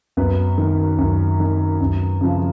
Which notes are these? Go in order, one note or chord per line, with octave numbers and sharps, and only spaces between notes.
F#2 B3 B4
D#3
F#2
D#3
F#2
C#3 F3